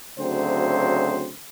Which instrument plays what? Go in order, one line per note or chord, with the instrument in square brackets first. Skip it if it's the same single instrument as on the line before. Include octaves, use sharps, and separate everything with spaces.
[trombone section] D2 C#3 F#3 C4 C5